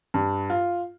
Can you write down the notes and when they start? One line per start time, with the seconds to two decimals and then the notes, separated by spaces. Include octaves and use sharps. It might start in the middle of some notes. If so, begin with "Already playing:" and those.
0.14 G2
0.50 F4